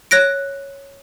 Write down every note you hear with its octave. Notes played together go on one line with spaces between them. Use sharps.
C#5 F#6 A#6 D7